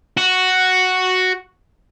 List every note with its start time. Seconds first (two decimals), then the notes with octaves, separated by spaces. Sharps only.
0.17 F#4